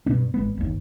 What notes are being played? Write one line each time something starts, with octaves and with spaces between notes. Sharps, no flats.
G2 B2 B3 D4
G#1 G#3 B3
G1 D#2